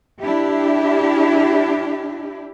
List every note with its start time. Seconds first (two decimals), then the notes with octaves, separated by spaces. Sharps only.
0.20 D4 E4 G4